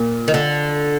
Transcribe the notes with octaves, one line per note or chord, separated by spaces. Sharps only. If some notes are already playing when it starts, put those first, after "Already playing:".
Already playing: A#2
D#3
D3